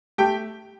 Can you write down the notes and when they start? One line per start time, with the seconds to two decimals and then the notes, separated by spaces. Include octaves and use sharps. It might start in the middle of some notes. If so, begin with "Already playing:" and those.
0.18 A3 G4 G5